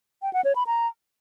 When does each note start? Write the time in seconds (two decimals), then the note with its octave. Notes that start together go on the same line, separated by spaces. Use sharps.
0.22 G5
0.33 F#5
0.44 C#5
0.56 B5
0.67 A#5